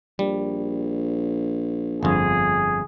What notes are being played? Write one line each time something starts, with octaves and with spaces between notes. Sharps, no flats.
A#1 G3
G1 F2 G#4